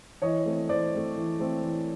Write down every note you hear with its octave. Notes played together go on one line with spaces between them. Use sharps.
E3 C#5 D#5
A3 C4
E3 C5 D5
A3 C4
E3
A3 C4
E3